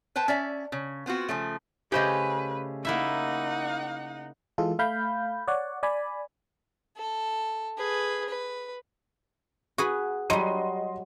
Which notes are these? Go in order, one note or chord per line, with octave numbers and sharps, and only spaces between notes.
B4 C5 G5 A5
C#4 D5 E5
C#3
B3 C4 F4 F#4
C#3 F3 A3
C#3 A3 G4 G#4 B4 C5 D#5
A#3 D#4 E4 E5 F#5
E3 G#3 F4 G#4 A4
A3 F5 B5 G6
C#5 D5 F#5
D5 G#5 B5
A4
G#4 B4
B4
F#4 G#4 B4
F#3 G3 D#5 C6 D#7